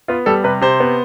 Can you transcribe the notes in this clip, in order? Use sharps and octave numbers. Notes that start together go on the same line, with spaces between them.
B3 F4
G3 A4
C3 B4
C3 C5
B3